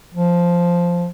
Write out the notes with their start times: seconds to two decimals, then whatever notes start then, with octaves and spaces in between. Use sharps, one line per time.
0.14 F3